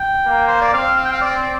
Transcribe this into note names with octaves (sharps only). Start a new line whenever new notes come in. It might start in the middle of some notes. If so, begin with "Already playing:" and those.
Already playing: G5
A#3
C5
D5
C4 F5
F5
G5
F5
D5